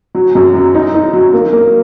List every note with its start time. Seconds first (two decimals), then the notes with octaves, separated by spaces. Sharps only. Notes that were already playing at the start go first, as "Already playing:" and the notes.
0.15 F#3
0.35 F#2
0.55 F#3
0.75 D#4
0.94 D#4
1.13 F#3
1.33 A#3
1.53 A#3